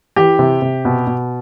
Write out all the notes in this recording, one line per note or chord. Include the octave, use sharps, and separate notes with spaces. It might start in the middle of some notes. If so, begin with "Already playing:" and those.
E3 G4
C3
C3
B2
B2